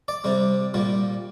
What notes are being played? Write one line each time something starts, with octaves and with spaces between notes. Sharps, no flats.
D5
C3 G3
A#2 G3